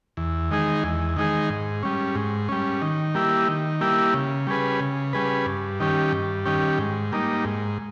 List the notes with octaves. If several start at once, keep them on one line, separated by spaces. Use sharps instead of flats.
E2
D#3 G#3 D#4 G#4
E2
D#3 G#3 D#4 G#4
G#2
G3 C#4
G#2
G3 C#4
D#3
G3 A#3 E4 G4
D#3
G3 A#3 E4 G4
C#3
G3 C#4 G#4 B4
C#3
G3 C#4 G#4 B4
G2
D#3 G3 C#4 G4
G2
D#3 G3 C#4 G4
G#2
G3 A#3 D#4
G#2